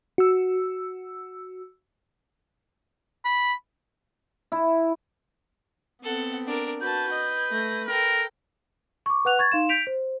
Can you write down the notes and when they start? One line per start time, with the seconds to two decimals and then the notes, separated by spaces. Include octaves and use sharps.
0.18 F#4 E6
3.25 B5
4.52 E4
6.03 B3 C4 A4 F#5
6.47 D4 A#4
6.81 F#4 B4 A5 G6
7.13 D#5
7.51 A3 A#6
7.88 A4 A#4 G5
9.06 C#6 D6
9.25 B4 F#5 F#6 F7
9.39 C#6 G#6 A6
9.52 D#4 F5 C6 E7
9.69 G6 B6 D7 F7
9.87 C5